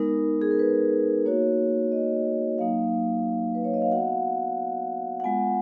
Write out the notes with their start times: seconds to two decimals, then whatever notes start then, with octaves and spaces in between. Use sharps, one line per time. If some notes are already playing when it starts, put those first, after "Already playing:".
Already playing: G#3 B3 D#4 A#4
0.42 G#4
0.51 A#4
0.59 B4
1.25 A#3 D#4 F#4 C#5
1.92 D#5
2.58 F#3 A#3 D#4 F5
3.55 B4
3.64 C#5
3.74 D#5
3.82 F5
3.91 B3 F#4 F#5
5.20 F#5
5.24 G#3 B3 F4 G#5